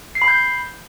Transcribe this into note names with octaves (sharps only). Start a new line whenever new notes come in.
C7
B5
G6